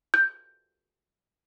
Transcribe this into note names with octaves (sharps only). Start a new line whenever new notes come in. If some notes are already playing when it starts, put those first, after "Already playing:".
G6